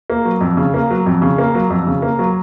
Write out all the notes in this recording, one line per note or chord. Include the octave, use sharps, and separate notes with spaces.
A#3
F#3
F2
C#3
A#3
F#3
F2
C#3
A#3
F#3
F2
C#3
A#3
F#3